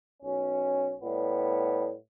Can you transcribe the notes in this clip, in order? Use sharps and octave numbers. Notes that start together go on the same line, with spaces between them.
B1 C#4
A2 G3 B3